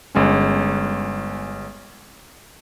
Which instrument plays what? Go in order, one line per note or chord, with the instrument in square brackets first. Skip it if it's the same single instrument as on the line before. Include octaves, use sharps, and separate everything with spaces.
[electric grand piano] G1 G#3 C#4